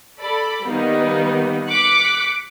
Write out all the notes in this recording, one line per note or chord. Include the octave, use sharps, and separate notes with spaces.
A4 D5 B5
D#3 G3 A#3 B3 D#4
D6 F#6 B6 C#7